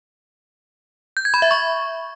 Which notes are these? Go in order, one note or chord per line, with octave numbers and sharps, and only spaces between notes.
G6
G#6
B5
E5
C#6